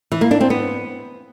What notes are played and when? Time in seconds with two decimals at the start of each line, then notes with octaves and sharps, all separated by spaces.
0.12 E3
0.21 A#3
0.31 D4
0.41 C4
0.50 B3